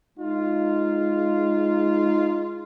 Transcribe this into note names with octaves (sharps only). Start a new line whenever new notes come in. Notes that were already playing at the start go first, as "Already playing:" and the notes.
G#3 D#4 F4